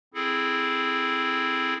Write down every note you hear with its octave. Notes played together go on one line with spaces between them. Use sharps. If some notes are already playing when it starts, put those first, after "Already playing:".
C4 E4 G#4 A4